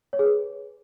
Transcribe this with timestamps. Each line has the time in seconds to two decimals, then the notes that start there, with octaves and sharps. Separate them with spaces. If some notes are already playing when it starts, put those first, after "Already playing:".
0.13 C#5
0.19 G#4
0.25 B4